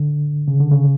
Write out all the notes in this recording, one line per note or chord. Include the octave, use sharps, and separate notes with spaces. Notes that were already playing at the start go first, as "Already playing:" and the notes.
Already playing: D3
C#3
D3
C#3